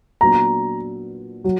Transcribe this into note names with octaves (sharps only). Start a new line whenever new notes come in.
A#2 F#3 B3 D4 F#4 A#5
F#3